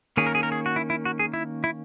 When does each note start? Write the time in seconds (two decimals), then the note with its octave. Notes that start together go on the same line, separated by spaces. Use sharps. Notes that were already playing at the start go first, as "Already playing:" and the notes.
0.17 D#3 A#3 C#4 G#4
0.26 A#4
0.35 G#4
0.43 A#4
0.52 G#4
0.66 F#4
0.76 E4
0.90 E4
1.05 F#4
1.19 G#4
1.34 E4
1.64 E4